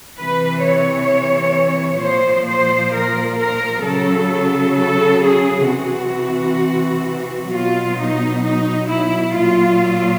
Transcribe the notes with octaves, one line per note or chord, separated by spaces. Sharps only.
C3 E3 B4
C#5
A#2 F3 C5
C5
A#4
A#4
C#3 F#3 A4
A4
G#4
C3 E3 F#4
B2 F#3 F4
D#4
D#4
E4
A#2 F#3 F4